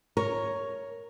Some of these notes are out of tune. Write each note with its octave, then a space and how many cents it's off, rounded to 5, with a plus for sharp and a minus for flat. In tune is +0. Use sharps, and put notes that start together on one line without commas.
A#4 +0 C#5 +0